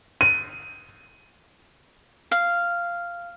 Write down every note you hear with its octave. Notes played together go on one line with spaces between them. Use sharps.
D#7
F5